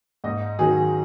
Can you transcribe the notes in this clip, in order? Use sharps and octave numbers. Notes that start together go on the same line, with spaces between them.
G#2 D#5
D#3 F#3 G#4